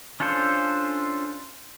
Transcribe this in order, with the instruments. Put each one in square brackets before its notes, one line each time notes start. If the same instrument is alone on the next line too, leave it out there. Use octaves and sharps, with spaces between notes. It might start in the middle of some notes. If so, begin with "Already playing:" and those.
[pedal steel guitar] C#4 D4 F4 A4 C5